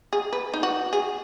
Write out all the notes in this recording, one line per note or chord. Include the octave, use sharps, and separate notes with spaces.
G#4
B4
D#4
F#4
G#4